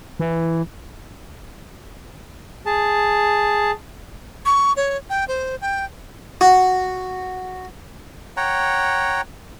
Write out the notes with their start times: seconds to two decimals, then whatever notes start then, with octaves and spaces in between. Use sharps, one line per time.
0.20 E3
2.66 G#4 A5
4.46 C#6
4.77 C#5
5.10 G5
5.28 C5
5.61 G5
6.41 F#4
8.37 C#5 F#5 G5 A#5